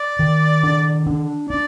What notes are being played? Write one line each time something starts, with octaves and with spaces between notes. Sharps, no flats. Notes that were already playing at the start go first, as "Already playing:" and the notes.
Already playing: D5
D#3
D4
D4
D4 D5